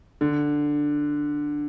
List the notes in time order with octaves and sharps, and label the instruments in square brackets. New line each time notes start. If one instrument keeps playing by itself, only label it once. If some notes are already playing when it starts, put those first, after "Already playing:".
[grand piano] D3